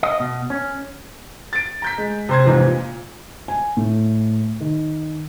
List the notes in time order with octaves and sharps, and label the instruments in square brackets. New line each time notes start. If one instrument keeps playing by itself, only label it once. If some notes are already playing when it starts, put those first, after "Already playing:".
[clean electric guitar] D#5
B2
C#4
[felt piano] A6 D7
A#5 G6 B6
G#3
C3 C5 G#6
F2 G#2 C3 E3 F3
A#2
G#5
A2
D#3